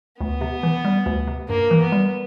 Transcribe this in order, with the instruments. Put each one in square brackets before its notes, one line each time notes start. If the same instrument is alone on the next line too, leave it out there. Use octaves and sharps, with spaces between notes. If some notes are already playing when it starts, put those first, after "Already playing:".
[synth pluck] D2 [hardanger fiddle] B3
[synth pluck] C3
E3
G3
D2
C3
[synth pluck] G2 [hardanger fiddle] A#3
[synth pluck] E3
[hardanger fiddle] B3
[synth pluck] G3